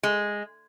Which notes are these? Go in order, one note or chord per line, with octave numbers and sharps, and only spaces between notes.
G#3